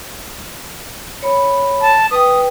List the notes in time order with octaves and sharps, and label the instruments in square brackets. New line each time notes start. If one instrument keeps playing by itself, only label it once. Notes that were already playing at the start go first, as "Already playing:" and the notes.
[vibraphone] C#5 B5
[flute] A5
[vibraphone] B4 G5 [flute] D#6